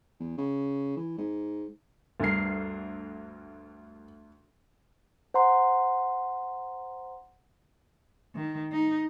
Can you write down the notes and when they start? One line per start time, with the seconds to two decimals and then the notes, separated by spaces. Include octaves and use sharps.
0.20 E2
0.38 C#3
0.96 E3
1.17 G#2
2.20 D2 G2 A#4 C7
5.34 C5 F#5 A#5 C6
8.35 D#3
8.72 D#4